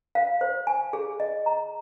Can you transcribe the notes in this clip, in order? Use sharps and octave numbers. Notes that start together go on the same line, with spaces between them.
F5
C5
G#5
G#4
D#5
A#5